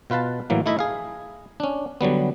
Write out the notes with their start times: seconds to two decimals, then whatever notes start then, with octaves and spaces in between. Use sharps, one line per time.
0.10 B2 F4 B4 F5 A5
0.50 A2 E3 F#3 A#3
0.66 A3 D#4 E4 D#5 E5
0.79 G#4 F5
1.60 C#4 D4
2.01 D3 F#3 G3 B3